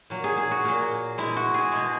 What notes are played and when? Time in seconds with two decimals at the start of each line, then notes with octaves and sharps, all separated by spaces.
0.10 A#2 F#3
0.24 G#4
0.38 G#4
0.51 F#4
0.64 A#2 F#3
1.18 B2 G#3 E4
1.36 F#4
1.54 G#4
1.72 B2 G#3